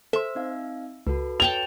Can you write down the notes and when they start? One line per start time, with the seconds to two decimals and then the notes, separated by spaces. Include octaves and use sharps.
0.13 A4 C5 E5 C6
0.35 C4 D#4 F5
1.07 C#2 F#4 A4 B4
1.40 C#5 G5 A5 F7